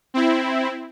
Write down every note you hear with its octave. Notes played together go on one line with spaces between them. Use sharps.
C4 E4